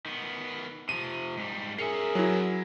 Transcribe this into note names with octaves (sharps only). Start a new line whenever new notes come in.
D#3 B3
C3 F3 D#7
G#2 G3
C#4 G#4 A#4 E5 C7 C#7
F#3 E4